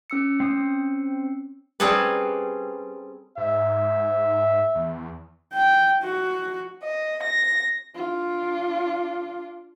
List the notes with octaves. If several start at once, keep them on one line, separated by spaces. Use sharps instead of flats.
C#4 E6 C#7
C4 D#6
G3 C4 C#4 G#4 A4 B4
G#2 E5
E2
G5
F#4
D#5
A#6
D4 F4